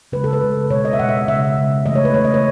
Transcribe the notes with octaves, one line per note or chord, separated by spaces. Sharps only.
C#3 G#3 B4
A4
B4
C#3 G#3
B2 G#3 C#5
D#5
E5
B2 G#3 F#5
E5
C#3 G#3 E5
C#3 G#3
C#3 E3 A3 D#5
C#5
B4
C#3 E3 A3 C#5
D#5
C#5